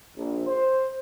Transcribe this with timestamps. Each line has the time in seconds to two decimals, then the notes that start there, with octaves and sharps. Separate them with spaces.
0.17 A#1
0.47 C5